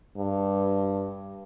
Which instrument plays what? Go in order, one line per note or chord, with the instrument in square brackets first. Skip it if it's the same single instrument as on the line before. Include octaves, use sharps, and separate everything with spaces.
[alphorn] G2